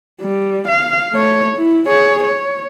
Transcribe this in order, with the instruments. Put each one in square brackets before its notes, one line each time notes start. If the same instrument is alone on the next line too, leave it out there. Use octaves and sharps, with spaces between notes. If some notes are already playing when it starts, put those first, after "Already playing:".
[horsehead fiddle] G3
F5
A3 C#5
E4
G#4 C#5
C#5